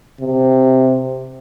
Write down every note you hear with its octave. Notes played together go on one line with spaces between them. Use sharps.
C3